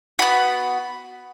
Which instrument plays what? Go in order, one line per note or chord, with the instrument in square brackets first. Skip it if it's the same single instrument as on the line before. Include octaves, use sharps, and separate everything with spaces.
[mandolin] B3 F#4 B5